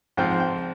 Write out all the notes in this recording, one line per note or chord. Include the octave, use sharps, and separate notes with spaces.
G#2 F3 C4 G5
G5